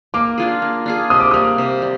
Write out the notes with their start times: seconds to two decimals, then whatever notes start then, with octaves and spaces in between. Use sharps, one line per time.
0.14 A#3 D6
0.38 D4 F4 G#4
0.62 A#3
0.86 D4 F4 G#4
1.10 C3 D#6
1.20 D6
1.31 G3 A#3 D#6
1.58 C3
1.82 G3